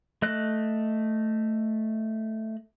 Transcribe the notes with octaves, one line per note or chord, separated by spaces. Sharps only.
A3 D#5 F#6